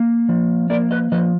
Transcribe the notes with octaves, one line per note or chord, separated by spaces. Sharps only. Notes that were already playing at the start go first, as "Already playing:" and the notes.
Already playing: A#3
F3
A#3 A#4 D5
B4 D#5
F3 B4 D#5